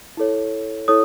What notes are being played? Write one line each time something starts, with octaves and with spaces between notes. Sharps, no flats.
E4 A4 C#5
E4 A4 C#5 D#6